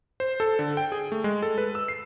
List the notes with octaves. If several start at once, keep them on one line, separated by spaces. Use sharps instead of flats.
C5
A4
D3
G5
G#4
A3
G#3
A4
B4
E6
C7